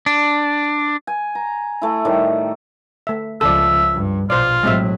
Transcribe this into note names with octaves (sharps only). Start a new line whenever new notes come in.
D4
G#5
A#5
A3 E4
A2 D#3 G3
A3 E5
C#2 F3 A4 D5 E5
G2
A#1 B2 F4 C5 D5
A2 F#3 G#3 C4 E5